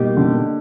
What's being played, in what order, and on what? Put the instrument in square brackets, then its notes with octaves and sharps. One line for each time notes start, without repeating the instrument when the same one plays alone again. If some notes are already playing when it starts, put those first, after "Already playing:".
Already playing: [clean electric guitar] B2 G3 A#3 D#4 G4
[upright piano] D3